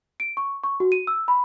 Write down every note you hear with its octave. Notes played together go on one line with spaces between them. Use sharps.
D7
C#6
C#6
F#4
D#7
E6
B5